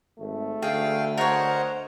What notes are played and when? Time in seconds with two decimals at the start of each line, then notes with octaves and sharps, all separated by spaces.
0.19 G#1 A3
0.62 D2 G#4 F5 G5
1.17 A#4 C5 C#5 D#5 F#5